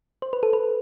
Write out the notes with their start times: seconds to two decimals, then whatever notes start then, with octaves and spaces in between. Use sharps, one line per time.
0.22 C5
0.33 B4
0.43 A4
0.53 B4